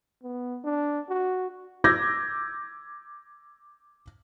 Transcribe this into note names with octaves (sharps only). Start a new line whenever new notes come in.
B3
D4
F#4
D6 E6 G6 G#6 A#6